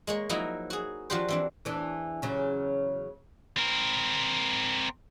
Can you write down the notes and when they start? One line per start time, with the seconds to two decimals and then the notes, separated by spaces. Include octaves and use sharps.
0.07 G#3 A#3 C#5
0.29 F3 F#3 A#3 D#4 E4
0.70 F#4 G#4
1.10 F3 D4 F#4 G4 C5
1.29 E3 C4 D4
1.65 E2 E3 D4
2.22 E2 C#3 F#3
3.57 C4 A#4